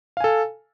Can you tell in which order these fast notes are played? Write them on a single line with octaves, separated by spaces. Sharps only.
F5 G#5 A4